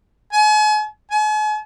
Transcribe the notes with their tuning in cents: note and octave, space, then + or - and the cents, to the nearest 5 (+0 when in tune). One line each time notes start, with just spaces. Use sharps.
G#5 +40
G#5 +45